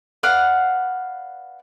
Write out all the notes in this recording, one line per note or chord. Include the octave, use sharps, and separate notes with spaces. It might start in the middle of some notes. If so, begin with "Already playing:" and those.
B4 D5 F5 F#5